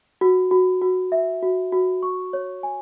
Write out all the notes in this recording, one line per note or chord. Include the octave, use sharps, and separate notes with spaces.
F#4
F#4
F#4
E5
F#4
F#4
C#6
C#5
G#5